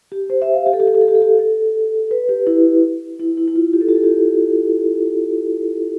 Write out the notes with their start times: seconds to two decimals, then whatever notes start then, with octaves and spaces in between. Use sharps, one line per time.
0.12 G4
0.30 C5
0.42 E5
0.54 F5
0.66 G4
0.73 A4
0.80 G4
0.87 A4
0.94 G4
1.01 A4
1.08 G4
1.15 A4
1.22 G4
1.39 A4
2.11 B4
2.29 G4
2.47 E4
3.20 E4
3.37 E4
3.48 E4
3.56 F4
3.73 G4
3.81 A4
3.88 G4
3.96 A4
4.04 G4